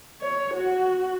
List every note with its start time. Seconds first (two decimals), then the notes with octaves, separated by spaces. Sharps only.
0.21 C#5
0.55 F#4